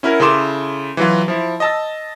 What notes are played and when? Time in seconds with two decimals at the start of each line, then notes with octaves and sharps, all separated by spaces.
0.03 C#4 E4 F#4 A#4
0.20 C#3 E4 A4 C6 D6 E7
0.97 E3 F#3 F4
1.28 F3 E4
1.60 D#5 A5 E6